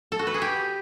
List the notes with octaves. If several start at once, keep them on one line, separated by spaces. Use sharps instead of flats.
A4
F#4
B4
G#4
G4